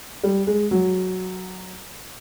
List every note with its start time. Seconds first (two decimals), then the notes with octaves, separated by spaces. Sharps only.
0.24 G3
0.47 G#3
0.71 F#3